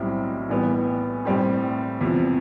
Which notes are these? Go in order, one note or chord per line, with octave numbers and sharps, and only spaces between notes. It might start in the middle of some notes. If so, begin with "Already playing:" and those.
Already playing: B1 A2 G3 C4 E4
A2 E3 G3 B3
A2 G3 C4
E2 C3 F3